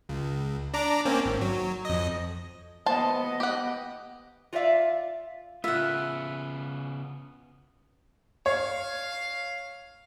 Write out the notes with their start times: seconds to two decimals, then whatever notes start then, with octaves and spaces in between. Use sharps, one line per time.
0.09 C#2
0.74 D4 A#5 D6
1.05 A#3 C4 C#4
1.25 G#1
1.41 F#3
1.85 F2 D#5
2.86 B3 C5 D#5 A5
3.40 G4 F#5
4.53 F4 F#4 C5 D5 E5 F5
5.64 C#3 B3 F4 E5 F#5
8.46 C#5 F5